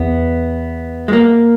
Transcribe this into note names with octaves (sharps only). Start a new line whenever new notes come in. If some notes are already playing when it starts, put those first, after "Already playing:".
Already playing: E2 B3
G#3
F#2 A#3